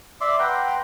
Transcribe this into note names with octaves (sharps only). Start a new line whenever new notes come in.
D5 E5 C6 D6
B4 F#5 G5 A#5 C6